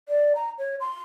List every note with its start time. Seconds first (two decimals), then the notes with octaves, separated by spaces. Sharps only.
0.09 D5
0.36 A#5
0.58 C#5
0.80 C6